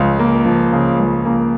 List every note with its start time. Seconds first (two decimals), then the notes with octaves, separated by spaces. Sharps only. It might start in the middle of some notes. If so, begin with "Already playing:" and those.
Already playing: C#2 C#3 F3
0.19 A#3
0.46 F3
0.73 C#3
0.99 C#2
1.25 A#3